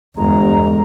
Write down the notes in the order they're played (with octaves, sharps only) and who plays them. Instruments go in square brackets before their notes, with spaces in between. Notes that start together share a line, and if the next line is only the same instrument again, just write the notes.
[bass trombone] G1 [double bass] E2 [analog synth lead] G#3 [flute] A#5